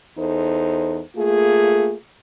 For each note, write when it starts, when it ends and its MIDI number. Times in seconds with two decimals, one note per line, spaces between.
0.18 1.00 40
0.18 1.00 63
0.18 1.00 69
0.18 1.00 72
1.16 1.94 57
1.16 1.94 58
1.16 1.94 65
1.16 1.94 68